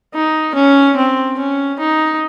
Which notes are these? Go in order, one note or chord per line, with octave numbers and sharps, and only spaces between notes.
D#4
C#4
C4
C#4
D#4